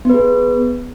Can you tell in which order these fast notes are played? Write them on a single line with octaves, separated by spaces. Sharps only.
B3 B4 G#4